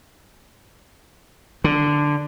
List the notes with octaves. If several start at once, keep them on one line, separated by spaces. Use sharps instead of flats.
D3